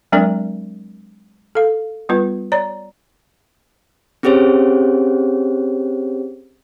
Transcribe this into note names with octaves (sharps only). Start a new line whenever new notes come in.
F#3 G#3 C4 D4 A#4 D5
A4 F5
G3 B3 F4 B4
C#5 D5 A#5
C4 C#4 G4 G#4 C5 C#5